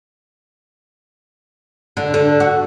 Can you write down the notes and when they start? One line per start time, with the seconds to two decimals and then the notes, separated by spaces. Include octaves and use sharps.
1.97 D3
2.14 D3
2.40 F#4